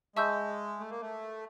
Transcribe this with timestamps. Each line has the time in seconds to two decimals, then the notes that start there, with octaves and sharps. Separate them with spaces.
0.16 G#3 E5 A5 C#6 E6 G6
0.80 A3
0.90 A#3
1.01 A3